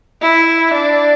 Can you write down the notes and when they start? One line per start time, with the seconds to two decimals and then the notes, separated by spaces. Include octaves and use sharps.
0.22 E4
0.73 D4